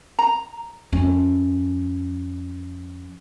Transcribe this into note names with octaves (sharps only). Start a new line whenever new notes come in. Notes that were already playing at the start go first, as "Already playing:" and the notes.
A#5
F2 C#4